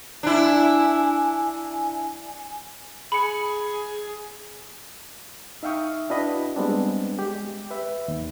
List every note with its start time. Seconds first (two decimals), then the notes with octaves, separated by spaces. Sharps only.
0.23 D4 E4 G#5
3.12 G#4 B5 C#7
5.63 D#4 E5 F5 G5 C#6 D#6
6.10 D4 E4 F#4 B4 D#5 B5
6.56 G3 G#3 B3 C4 D4
7.19 G#3 G4
7.71 B4 E5
8.08 D#2